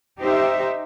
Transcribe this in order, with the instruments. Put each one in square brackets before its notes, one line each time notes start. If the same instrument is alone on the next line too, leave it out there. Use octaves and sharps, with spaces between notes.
[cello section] D#4 G4 C5 E5